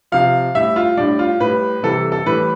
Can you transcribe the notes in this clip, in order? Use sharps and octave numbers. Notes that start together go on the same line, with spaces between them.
C3 F3 F5
A2 G3 E5
F4
A2 G3 D4
F4
A2 G3 B4
C3 E3 G3 A4
A4
A2 E3 G3 B4